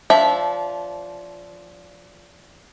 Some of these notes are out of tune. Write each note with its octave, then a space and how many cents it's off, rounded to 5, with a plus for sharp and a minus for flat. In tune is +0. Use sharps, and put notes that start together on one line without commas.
F3 +0 D4 -25 E5 +0